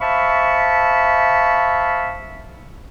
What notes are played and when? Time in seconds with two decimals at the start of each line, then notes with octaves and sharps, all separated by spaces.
0.01 C5 E5 F5 A5 B5 C#6